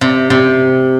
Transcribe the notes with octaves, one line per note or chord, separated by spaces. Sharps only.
C3
C3